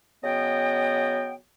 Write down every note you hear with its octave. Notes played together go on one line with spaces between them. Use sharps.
C#3 F#3 B3 D#5 G5